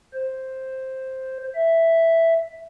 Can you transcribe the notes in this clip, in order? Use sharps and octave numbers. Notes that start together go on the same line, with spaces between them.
C5
E5